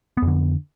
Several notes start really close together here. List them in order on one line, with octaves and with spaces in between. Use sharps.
B3 F2 D3